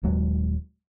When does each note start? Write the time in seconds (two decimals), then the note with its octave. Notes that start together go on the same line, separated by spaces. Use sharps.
0.03 D#1 D#2 F#3 G#3